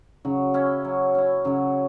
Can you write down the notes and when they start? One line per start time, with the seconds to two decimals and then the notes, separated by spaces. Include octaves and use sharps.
0.25 C#3 F#3
0.54 C#4 E4
0.85 F#3
1.15 C#4 E4
1.45 C#3 F#3